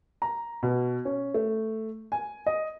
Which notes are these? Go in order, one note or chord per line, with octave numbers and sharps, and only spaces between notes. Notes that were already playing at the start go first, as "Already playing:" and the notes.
A#5
B2
C#4
A3
G#5
D#5